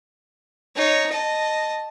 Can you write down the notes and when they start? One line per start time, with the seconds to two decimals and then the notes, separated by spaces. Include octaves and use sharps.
0.76 D#4 C#5
1.11 D#5 A5